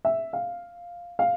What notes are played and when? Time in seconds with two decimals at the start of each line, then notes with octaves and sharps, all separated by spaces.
0.05 E5
0.33 F5
1.19 F5